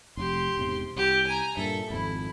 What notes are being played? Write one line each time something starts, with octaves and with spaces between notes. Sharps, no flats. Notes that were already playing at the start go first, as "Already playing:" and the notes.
F1 G4 C6
E1 G#2 C3
C2 G4
G#5 A#5
G2 A#2 A4 E5
G#1 F2 E4